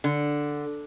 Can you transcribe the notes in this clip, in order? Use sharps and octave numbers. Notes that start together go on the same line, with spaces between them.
D3